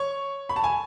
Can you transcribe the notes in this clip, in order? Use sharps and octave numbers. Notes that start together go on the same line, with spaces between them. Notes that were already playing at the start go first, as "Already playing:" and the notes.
Already playing: C#5 C#6
B5
A5
G#5